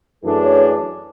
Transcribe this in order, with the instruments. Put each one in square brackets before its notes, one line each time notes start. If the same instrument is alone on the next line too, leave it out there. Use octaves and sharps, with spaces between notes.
[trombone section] F#2 E3 A3 D4 G#4 [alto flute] A4
[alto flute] C#5